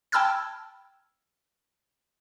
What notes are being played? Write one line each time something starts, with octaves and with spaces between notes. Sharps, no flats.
G5 A5 B5 E6 F6 G#6